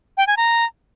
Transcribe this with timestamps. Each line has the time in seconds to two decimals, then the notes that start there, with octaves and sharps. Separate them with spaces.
0.18 G5
0.27 G#5
0.37 A#5